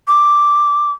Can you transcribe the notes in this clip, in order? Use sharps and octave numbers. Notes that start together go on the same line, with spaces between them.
D6